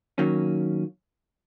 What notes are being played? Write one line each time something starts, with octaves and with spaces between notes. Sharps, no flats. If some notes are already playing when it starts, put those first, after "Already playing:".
D#3 F#3 A#3 C#4